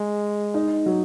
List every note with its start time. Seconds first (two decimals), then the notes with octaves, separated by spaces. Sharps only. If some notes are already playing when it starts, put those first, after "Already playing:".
Already playing: G#3
0.54 D#4
0.86 F#3